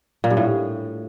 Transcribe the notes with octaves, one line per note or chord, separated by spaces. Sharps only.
A#2
G2
A2